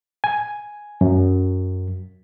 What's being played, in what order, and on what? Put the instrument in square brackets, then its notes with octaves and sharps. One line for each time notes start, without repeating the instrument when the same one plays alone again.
[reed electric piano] G#5
F#2